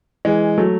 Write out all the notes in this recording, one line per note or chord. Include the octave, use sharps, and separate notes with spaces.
E3 G#3
F#3 A3